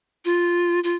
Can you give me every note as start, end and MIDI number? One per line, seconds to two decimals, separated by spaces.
0.25 0.80 65
0.84 0.94 65